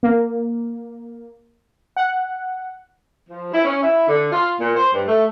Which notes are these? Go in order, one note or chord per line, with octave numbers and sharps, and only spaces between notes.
A#3
F#5
F3
E4
C#4
E4
D3
F4
A#2
C5
G2
A3